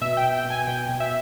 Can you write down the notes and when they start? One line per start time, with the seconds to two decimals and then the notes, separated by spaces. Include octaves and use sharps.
0.01 B2 E5
0.17 G5
0.23 B2
0.34 G5
0.45 B2
0.50 G#5
0.67 B2 G5
0.89 B2
1.00 E5